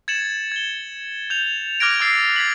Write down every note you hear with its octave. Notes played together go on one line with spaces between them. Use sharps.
G#6 A6 C#7 E7 F#7
G#6 G7
G6 F7
D6 F6 F#6 G#6 A#6 D7
D6 E6 F#6 A6 C7 D7
G#6 A6 B6 C7 F#7